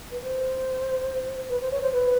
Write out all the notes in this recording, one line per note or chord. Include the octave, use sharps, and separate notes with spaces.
B4
C5
B4
C5
C#5
C5
B4